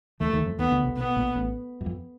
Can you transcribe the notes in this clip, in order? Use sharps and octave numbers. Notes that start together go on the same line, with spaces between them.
D#2 D#3 A3
E3
D#2 D#3
F2 F3
D#2 D#3 B3
D2 D3
C2 C3
B1 B2 B3
A#1 A#2
A1 A2
F#2
F2